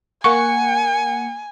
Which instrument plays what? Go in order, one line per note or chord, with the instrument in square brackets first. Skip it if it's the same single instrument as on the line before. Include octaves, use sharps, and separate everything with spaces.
[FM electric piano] A#3 F#5 C#7 [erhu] G#5 [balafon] C#6